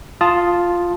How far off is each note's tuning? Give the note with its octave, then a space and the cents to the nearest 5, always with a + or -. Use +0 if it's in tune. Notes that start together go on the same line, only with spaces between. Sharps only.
F4 +0 A5 +0 D#6 +0